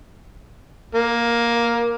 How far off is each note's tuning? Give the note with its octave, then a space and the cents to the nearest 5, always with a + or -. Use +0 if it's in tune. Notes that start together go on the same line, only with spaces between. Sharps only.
A#3 +10